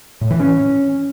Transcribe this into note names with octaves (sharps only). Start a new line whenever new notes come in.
A2
E3
C#4